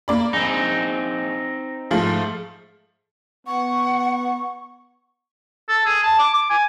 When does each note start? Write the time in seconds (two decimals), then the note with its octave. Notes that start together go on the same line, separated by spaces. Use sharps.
0.08 A#3 D5 B5
0.33 A#1 C4 D#4
1.91 G#2 F3 A3
3.47 B3 F#5 C#6
5.69 A4
5.86 G#4
6.03 A5
6.19 D6
6.34 D6
6.50 G#5